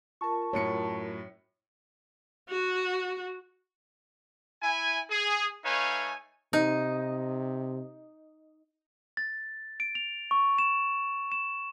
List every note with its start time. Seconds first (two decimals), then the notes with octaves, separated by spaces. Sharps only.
0.21 F4 A#4 A5 C#6
0.53 F#2 A2 C#5 C#7
2.49 F#4
4.63 E4 G#5
5.10 G#4
5.64 A3 D#4 B4 C#5 F5 G#5
6.53 C3 D#4
9.17 A6
9.80 D7
9.95 F7
10.31 C#6
10.58 E7
11.32 E7